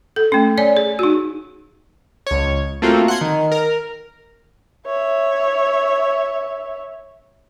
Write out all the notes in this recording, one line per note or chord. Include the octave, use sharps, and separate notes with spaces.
A4
A3 C#4
C#5 D5 G#5
G#4
D#4 F#4
C#2 C#5
A3 A#3 C4 F4 F#4
F#5 C6 G#6
D#3
A#4
C#5 E5